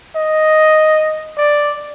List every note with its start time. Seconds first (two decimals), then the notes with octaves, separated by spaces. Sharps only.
0.15 D#5
1.37 D5